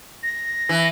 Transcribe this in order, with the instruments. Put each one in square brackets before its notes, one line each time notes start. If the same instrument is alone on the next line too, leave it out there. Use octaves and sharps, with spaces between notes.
[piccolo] A#6
[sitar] E3